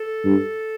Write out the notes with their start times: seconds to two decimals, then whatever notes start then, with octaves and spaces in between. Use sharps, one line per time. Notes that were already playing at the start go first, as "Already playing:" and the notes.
Already playing: A4
0.25 G2